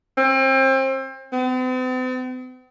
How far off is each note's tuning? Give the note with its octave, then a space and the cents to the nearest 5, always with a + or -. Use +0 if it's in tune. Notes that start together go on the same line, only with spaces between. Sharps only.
C4 +30
C4 -45